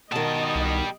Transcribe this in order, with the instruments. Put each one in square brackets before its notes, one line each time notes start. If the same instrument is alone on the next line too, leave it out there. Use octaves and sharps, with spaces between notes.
[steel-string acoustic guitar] B2 D#3 [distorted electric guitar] G3 A5 [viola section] D#5
[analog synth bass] C2